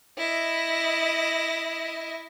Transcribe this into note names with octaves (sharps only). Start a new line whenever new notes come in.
E4 D#5